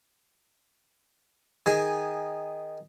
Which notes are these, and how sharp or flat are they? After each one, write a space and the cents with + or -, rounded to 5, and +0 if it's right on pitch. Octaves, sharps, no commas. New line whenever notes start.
D#3 +0 G#4 -15 G#5 +0